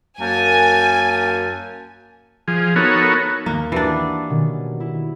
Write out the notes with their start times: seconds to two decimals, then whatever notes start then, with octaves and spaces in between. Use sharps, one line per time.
0.21 F#2 A#3 G#5 A5
2.48 F3 G#4
2.76 B3 D#4 F#4 A4 A#4 C#5
3.46 D#2 A#3
3.72 E3 D4 F#4 G4 D6
4.29 B2 D#3 C#4
4.80 E4